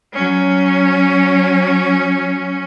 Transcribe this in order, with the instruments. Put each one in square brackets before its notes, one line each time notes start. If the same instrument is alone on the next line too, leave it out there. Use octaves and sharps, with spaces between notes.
[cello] F#3 C#4